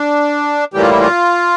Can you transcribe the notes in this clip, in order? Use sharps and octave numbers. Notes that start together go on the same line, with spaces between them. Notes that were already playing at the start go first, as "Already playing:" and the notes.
Already playing: D4
A2 E3 G3 A#3 G4
F4
E4
F4